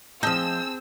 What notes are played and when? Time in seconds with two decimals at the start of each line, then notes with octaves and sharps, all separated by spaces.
0.23 F3 C4 G#4 D#5 A5 E6 G6